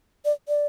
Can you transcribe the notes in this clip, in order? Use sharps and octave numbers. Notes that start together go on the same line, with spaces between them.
D5
D5